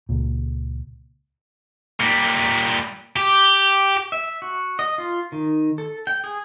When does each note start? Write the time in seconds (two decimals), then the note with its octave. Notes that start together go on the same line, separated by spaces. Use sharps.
0.09 C#2 A#2
2.00 A#2 G3
3.16 G4
4.12 E5
4.42 F#4
4.79 D#5
4.98 F4
5.32 D#3
5.78 A4
6.07 G5
6.24 G#4